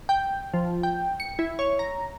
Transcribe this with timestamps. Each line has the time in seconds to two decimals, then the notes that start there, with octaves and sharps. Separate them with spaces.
0.09 G5
0.54 F3
0.83 G5
1.20 C#7
1.39 E4
1.59 C#5
1.79 A#5